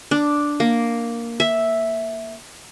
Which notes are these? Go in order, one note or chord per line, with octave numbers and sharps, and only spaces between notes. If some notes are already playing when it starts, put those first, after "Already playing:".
D4
A#3
E5